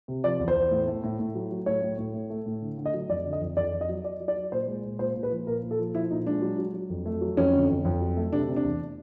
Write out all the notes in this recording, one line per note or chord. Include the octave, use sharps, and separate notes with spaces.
C3
F3 D5
E2
C5
E2
A2
A3
A2
A2
F#3
F#3
A2 C#5
A2
A2
A3
A3
A2
D3
D3
D#5
F#3
F2 D5
D3
D#5
F2
F2 D5
F2
D#5
F#3
F#3 D5
F#3
D5
F#3
A#2 C5
G#3
A#2
A#2 C5
A#2
B4
F3
A#2 A#4
A#2
A4
F3
F3 E4
A#2 D#4
G#3 D4
F#3
F#3
F#3
F2
A3
F#3
F2 C#4
D3
F2
F2
F#3
A3
C3 D4
C3
D4
E2